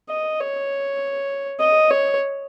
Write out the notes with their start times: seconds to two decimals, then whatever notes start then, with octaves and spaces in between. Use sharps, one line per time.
0.09 D#5
0.40 C#5
1.60 D#5
1.90 C#5